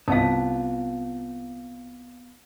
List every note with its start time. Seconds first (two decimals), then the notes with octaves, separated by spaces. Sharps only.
0.08 C2 B3 F4 F5 A5